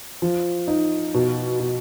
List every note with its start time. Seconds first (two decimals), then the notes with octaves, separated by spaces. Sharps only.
0.22 F3
0.68 D#4
1.14 B2
1.60 B2